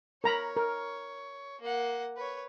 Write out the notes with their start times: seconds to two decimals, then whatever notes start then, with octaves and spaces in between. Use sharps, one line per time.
0.24 A#4 C#5 A#5 B5
0.56 A#4
1.61 A#3 F#5
2.17 B4 C#5